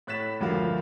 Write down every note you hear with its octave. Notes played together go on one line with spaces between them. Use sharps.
A2 C#5 F#6 A6 B6 E7
D2 G2 F3 F#4 A#4 F5